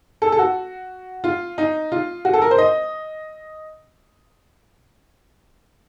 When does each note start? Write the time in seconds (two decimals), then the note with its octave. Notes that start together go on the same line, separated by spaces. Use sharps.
0.22 A4
0.32 A4
0.39 F#4
1.24 F4
1.58 D#4
1.92 F4
2.25 F#4
2.33 A4
2.42 A#4
2.51 C5
2.58 D#5